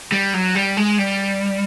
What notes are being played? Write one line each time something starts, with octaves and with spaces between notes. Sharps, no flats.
G3
F#3
G3
G#3
G3